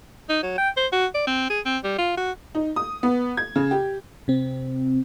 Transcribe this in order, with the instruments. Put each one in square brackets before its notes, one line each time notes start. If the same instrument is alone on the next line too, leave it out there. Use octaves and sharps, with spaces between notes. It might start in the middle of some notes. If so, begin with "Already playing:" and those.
[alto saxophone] D#4
F#3
G5
C5
F#4
D5
C4
G#4
C4
G3
F4
F#4
[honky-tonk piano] D#4
D#6
B3
G#6
C#3
G4
[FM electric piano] C3 C4